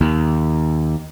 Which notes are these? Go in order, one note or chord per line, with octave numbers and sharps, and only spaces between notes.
D#2